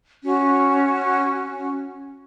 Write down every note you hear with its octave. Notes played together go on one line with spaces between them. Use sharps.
C#4 F#4